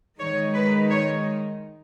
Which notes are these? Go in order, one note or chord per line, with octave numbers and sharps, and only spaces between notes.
D#3 G#3 D#4 C#5
B4
C#5